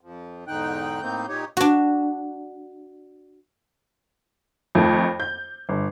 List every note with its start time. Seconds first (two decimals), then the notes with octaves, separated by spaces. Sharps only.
0.01 F2 F3
0.47 E2 G#2 D3 D#4 G5 F#6
1.02 A2 A#3 C4 D#4 G6
1.28 A#2 D#4 G4 C#5
1.57 D4 F#4
4.75 F2 D#3 A3 F4
5.20 G6
5.69 G1